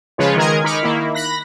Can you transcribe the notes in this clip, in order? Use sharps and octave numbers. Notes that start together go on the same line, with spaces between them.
C#3 F3 G#3 F4 B4 C#5
D#3 G#3 G#4 A#4 D#5 G#6
D#4 B5 C#6 D6 F6
D#3 A#3 E4
B5 F#6 A#6